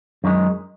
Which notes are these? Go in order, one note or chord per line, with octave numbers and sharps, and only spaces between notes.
F#2 D#3 G#3